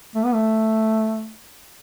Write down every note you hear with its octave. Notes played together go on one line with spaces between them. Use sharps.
A3
B3
A3